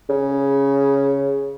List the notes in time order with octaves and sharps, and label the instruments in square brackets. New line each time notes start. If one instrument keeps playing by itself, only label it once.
[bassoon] C#3